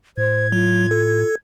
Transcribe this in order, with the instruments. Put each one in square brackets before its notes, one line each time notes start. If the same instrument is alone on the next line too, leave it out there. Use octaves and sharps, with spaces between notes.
[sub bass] A2 [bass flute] C5 [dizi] G#6
[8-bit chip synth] F#3 [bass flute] F4
[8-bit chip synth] A4